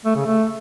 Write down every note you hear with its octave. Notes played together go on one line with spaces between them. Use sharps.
A3
C#3
A3